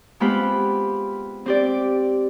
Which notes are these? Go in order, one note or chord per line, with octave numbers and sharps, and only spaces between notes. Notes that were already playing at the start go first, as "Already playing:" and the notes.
G#3 B3 C4 F4 G4 B5
C4 G4 D5